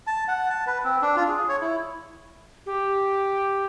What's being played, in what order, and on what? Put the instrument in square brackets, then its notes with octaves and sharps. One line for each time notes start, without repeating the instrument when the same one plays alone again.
[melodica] A5
F#5
A5
B4
C4
D4
F4
G#4
C#5
E4
[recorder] G4